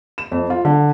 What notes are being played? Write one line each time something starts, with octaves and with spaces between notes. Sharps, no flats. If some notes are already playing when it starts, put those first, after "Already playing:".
E7
F2
F4
D3